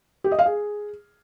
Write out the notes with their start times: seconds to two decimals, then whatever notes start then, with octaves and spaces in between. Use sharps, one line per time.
0.24 G4
0.31 D#5
0.39 F5
0.46 G#4